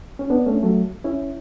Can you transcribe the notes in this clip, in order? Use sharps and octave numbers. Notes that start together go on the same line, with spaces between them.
C#4
B3 D4
A3 C#4
F#3 A3
C#4 E4